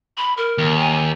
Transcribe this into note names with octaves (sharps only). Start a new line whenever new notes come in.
B5
A#4
D#2
G#5